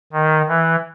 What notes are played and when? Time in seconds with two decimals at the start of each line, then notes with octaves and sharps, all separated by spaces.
0.13 D#3
0.48 E3